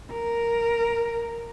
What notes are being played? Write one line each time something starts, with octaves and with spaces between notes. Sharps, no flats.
A#4